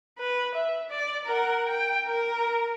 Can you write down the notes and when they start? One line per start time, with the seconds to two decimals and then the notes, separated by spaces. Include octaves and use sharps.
0.19 B4
0.55 E5
0.90 D5
1.25 A#4 F#5
1.67 G5
2.05 A#4